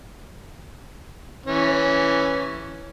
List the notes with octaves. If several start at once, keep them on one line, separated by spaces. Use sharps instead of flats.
E3 C#4